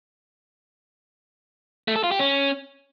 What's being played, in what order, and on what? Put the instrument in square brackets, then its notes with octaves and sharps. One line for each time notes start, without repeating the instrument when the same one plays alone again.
[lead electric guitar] A3
A4
F4
G4
C#4